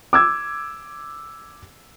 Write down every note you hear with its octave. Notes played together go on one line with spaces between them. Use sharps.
D6 E6 G#6